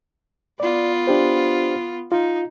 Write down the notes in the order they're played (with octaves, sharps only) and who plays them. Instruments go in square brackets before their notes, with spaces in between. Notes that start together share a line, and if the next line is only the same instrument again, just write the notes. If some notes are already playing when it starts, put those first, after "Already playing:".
[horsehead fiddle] B3 F4 [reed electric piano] D5
[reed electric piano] D4 G4 C5
[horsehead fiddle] D#4 [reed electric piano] F4